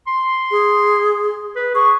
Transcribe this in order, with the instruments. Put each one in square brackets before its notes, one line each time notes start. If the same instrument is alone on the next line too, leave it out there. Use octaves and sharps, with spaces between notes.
[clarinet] C6
[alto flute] G#4
[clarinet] B4
[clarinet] G#4 [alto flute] C#6